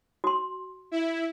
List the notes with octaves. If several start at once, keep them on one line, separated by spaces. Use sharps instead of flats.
F#4 C6
E4